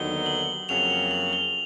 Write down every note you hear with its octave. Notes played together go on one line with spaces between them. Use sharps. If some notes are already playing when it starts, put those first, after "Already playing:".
Already playing: D#2 D3 F#3 B3 D#4 G7
F#7
F2 C#3 F#3 A#3 C#4 F7
F#7
F#7
G7